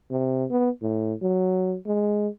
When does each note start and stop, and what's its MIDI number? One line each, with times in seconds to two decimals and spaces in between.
0.11 0.45 48
0.50 0.70 59
0.82 1.14 45
1.22 1.76 54
1.87 2.28 56